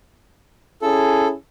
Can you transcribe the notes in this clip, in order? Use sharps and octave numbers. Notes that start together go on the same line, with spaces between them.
C#4 E4 G#4 A4